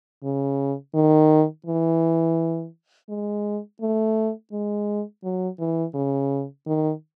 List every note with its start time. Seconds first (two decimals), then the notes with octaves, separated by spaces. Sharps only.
0.24 C#3
0.94 D#3
1.66 E3
3.09 G#3
3.81 A3
4.52 G#3
5.24 F#3
5.59 E3
5.94 C#3
6.67 D#3